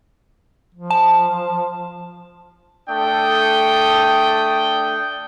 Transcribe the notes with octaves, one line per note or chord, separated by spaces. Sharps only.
F3
A5
A3 D4 A4 G5 D#6